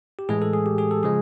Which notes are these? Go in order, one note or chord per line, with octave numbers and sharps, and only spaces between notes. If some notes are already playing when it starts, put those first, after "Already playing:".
G4
A2 E3 G#3 G#4
A4
G#4
G4
G#4
A4
C#3 F3 G#3 G#4